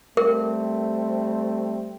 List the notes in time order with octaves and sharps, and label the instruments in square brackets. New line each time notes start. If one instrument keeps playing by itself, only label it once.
[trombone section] G3 A3 C4 [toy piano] A#4